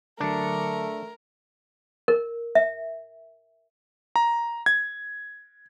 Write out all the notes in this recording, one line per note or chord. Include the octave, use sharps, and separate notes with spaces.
D3 F#3 A3 D4 A#4 C#7
A#4
E5
A#5
G#6